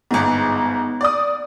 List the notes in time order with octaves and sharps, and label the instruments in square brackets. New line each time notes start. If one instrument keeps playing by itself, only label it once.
[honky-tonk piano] G1 G#2 [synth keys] B3 D#4
[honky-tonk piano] D5 D#6